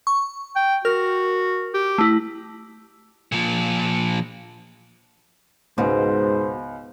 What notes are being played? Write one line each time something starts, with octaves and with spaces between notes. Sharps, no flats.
C#6
G5
F#4 A#4 F6
G4
A3 E4
A#2 F3
C#2 G#2 B2 C5